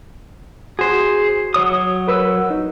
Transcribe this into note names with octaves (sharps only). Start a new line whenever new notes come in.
F#4 G#4 C5
F#3 C#5 D#6
A#4 B4 E6
D#4